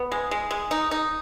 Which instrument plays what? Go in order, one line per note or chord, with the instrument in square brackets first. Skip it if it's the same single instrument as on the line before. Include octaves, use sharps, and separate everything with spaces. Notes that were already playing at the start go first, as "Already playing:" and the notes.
Already playing: [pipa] B3
G#3
G#3
G#3
D#4
D#4